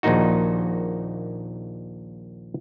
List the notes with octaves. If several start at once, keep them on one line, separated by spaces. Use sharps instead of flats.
A#1 D#2 A#2 D#3 D#4 F#4